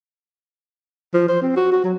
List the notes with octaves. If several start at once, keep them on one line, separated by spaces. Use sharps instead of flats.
F3
C5
C4
F#4
F#4
F#3